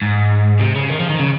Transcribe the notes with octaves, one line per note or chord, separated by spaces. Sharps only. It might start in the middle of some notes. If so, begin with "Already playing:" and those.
G#2
C3
C#3
D#3
F3
D#3
C#3